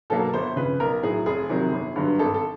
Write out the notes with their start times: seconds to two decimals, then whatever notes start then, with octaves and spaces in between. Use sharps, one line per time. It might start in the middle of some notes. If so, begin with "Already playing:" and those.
0.10 B2 F#3 A#3 A4
0.33 G1 C5
0.56 F2 C#3 B4
0.80 B1 A#4
1.03 A2 F#3 G#4
1.26 F1 G#4
1.49 F2 C3 D#3 F#3
1.72 G1
1.96 G2 D3 F#3 B3
2.19 G#1 A4
2.34 A4